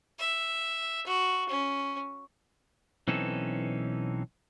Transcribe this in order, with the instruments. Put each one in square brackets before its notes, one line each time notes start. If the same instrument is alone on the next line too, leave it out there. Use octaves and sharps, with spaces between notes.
[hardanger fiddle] E5
F#4
C#4
[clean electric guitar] B1 E3 C4 C#4 D#4 A4